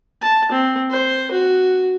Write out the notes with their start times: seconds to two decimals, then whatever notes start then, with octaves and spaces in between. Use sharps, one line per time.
0.22 A5
0.52 C4
0.91 C5
1.32 F#4